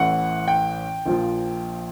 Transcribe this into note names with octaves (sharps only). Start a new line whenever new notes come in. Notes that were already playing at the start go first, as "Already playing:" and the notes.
Already playing: A1 A2 E3 F#5
G5
A#1 A#2 F3